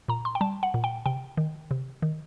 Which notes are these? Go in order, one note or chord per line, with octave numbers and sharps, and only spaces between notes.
A#2 A#5
C6
G5
G3 A5
F#5
A#2
G5
C3 G5
D#3
C3
D#3